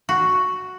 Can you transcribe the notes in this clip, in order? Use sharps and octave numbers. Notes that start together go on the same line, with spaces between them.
F#4